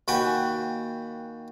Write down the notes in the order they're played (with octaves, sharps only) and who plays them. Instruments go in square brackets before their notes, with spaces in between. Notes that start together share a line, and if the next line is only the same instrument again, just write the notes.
[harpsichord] D#2 F#4 B4 G5 G#5